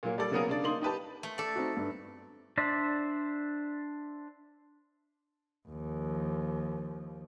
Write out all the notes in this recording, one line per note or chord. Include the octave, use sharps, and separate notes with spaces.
A#2 F#3 A#3
G3 A#3 A4 D5
C#3 F#3 A#3 B3 G#4 A#4
C#3 D4 D5
A#3 D#4 C6 F#7
D#4 G4 B4 A5
A3
A4 D5
C4 D#4 F#4
G2
D4 C5 D5 E5
D#2 F3